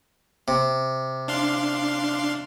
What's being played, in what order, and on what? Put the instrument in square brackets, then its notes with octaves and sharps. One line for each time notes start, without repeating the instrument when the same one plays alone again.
[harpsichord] C3
[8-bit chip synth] D4 F5 C6